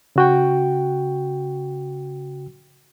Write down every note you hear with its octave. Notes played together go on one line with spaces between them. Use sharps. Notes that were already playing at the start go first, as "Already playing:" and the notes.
C#3 F#4 G5